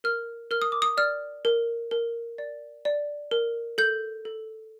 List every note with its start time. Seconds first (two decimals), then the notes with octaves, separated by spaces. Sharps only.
0.04 A#4 F6
0.51 A#4 F6
0.62 D#6
0.72 D6
0.82 D#6
0.97 D5 F6
1.45 A#4
1.91 A#4
2.38 D5
2.85 D5
3.31 A#4
3.78 A4 G6
4.25 A4